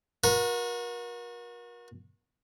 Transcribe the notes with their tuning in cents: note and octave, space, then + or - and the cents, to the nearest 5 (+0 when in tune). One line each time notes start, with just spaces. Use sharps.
F#4 -35 A#4 +35